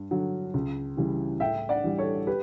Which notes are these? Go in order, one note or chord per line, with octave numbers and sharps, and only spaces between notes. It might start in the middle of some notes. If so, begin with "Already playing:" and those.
Already playing: G2
D3 F#3
C#2
C#3 E3 G3
A2 E5 G5
D5 F#5
E3 G3
A4 C#5
G4 B4